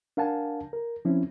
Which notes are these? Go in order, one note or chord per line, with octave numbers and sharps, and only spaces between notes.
D4 A#4 F5 F#5 G#5 A5
A#4
F3 C4 C#4 E4